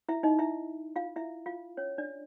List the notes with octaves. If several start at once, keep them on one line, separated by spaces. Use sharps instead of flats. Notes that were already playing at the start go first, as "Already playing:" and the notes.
E4 E5
D#4 D#5
E4 E5
F4 F5
E4 E5
F4 F5
C#4 C#5
D4 D5